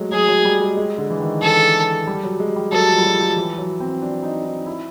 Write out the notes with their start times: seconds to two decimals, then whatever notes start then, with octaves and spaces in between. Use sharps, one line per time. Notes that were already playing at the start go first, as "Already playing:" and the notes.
Already playing: F#3 G#3 A3
0.12 F#3 G#4
0.28 F#3
0.45 G3
0.60 G#3
0.77 G#3
0.98 D3
1.10 E3
1.20 D#3
1.42 E3 A4
2.07 G3
2.23 F#3
2.40 G#3
2.56 G3
2.72 F#3 A4
2.88 F3
2.98 G3
3.04 F#3
3.20 F3
3.36 E3
3.58 F#3
3.80 C4
4.02 D4
4.23 D#4
4.45 D#4
4.66 E4